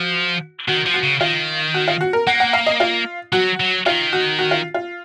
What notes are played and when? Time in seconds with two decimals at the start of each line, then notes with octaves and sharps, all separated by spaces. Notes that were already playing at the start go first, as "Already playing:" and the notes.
Already playing: F3 F#4
0.68 D#3 F#4
0.86 F3
0.94 F#4
1.03 C#3
1.21 D#3 F4
1.74 F#4
1.88 F4
2.01 F#4
2.13 A#4
2.27 A#3 F#5
2.40 F#5
2.53 F5
2.67 D#5
2.80 F4
3.32 F#3 F#4
3.60 F#3
3.86 D#3 F4
4.13 F#4
4.39 F#4
4.51 F4
4.74 F4